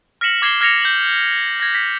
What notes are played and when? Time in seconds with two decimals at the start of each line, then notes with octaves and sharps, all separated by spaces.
0.21 F6 A#6 B6 C#7 E7 F#7
0.42 D6 G#6 C7 E7 G7
0.61 F6 G#6 A#6 C#7 F7
0.82 G6 F#7
1.60 G#6 A#6
1.75 B6